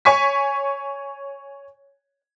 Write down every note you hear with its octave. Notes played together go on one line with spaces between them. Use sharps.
C#5 G#5 C#6 B6